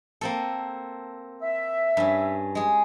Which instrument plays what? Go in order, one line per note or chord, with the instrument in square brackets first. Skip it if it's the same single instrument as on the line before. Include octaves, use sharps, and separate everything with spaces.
[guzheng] A#3 C4 A4
[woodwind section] E5
[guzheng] G2 C#4
G#3 G#4